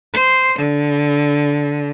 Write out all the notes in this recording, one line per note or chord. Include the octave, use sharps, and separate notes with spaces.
C5
D3